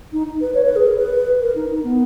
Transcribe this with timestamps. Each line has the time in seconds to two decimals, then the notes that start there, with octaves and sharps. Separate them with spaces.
0.13 D#4
0.41 B4
0.55 C#5
0.66 B4
0.76 G#4
0.87 A#4
0.98 B4
1.41 A#4
1.56 D#4
1.70 D#4
1.84 B3